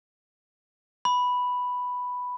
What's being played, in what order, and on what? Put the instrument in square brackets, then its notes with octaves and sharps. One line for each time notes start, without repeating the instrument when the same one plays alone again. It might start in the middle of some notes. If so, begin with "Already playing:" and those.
[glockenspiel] B5